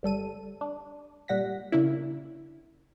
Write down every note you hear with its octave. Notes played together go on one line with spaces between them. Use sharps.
G1 G3 A4 D#7
D4
A#2 G3 F#5 A#6 B6
C#3 A#3 C#4 D4 E4